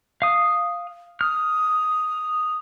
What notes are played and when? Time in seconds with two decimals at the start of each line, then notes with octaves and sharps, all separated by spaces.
0.22 F5 D#6
1.21 D#6 F6